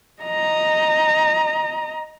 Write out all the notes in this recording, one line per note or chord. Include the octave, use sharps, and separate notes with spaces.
D#5 A#5